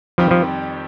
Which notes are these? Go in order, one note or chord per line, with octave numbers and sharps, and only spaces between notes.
F2 D#3 F3 G3 C4 G4
F3